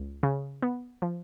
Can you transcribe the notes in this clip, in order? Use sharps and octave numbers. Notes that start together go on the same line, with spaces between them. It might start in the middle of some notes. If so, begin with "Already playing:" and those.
Already playing: C#2
C#3
B3
F3